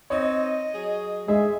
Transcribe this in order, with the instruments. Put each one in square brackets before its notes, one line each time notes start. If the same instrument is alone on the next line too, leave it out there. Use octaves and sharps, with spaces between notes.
[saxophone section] C4 D#4 [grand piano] C#5 [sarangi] D#5
[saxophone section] F#3 G#4
[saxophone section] G#2 E5 [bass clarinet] G#3 [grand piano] G#4